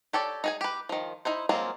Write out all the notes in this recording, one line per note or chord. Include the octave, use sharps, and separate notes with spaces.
G4 A4 C#5 D5
D#4 G#4 G#5
G4 B4
D#3 F3
D#4 E4 C5
F#3 G#3 A#3 C4 F4